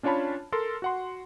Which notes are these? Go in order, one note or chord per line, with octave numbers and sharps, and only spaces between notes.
C#4 D4 F4 C#5 A5 B5
A4 A#4 C6
F#4 F#5 C6